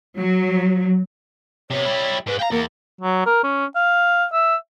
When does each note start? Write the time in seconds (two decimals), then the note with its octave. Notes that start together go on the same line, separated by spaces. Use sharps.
0.17 F#3
1.71 C3 B3 C#5
1.85 G3 E4
2.27 G#2 G#3 B4
2.39 F5 G5 A#5
2.51 E2 A#3
3.01 F#3
3.26 A#4
3.43 C#4
3.76 F5
4.33 E5